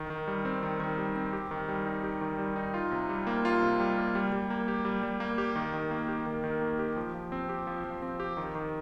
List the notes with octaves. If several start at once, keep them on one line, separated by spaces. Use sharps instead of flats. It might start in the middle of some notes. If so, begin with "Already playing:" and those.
Already playing: D#3
D#3
G3
C4
D#3
D#3
G3
C4
G4
D#3
G3
D#4
G4
D#3
G3
D#4
F4
C3
G3
A#3
F4
C3
G3
A#3
G3
G3
A#3
G4
G3
G3
A#3
G4
D#3
D#3
A#3
G4
D#3
D#3
A#3
G4
F3
F3
C4
G4
F3
F3
C4
G4
D#3
D#3